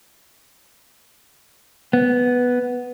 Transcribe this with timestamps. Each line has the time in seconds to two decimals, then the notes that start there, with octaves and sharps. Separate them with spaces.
1.93 B3